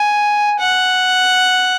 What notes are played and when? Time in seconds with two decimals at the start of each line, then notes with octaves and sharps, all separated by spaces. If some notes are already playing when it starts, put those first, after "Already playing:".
Already playing: G#5
0.59 F#5